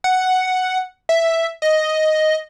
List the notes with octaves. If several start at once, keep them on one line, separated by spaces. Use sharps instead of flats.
F#5
E5
D#5